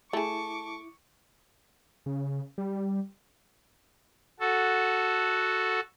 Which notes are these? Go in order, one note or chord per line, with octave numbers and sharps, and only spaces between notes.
A3 E4 G#4 A5 C#6 D6
C#3
G3
F#4 A4